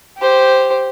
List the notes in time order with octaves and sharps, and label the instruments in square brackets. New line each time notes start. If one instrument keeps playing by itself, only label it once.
[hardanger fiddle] G4 C5